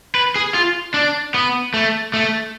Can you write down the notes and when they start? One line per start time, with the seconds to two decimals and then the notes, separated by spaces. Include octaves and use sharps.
0.15 B4
0.36 G#4
0.54 F4
0.94 D4
1.34 B3
1.74 A3
2.14 A3